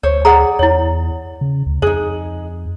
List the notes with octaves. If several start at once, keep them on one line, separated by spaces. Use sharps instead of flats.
D2 C5 C#5
G#4 D5 F#5 A#5
E2 E4 C#5
C#3
D2
F2 D#4 G#4 C5